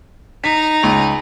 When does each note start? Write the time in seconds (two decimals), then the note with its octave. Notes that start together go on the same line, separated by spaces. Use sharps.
0.44 D#4 B6
0.83 C#2 F7